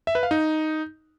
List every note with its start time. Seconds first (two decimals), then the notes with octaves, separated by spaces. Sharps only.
0.07 E5
0.15 B4
0.23 F5
0.31 D#4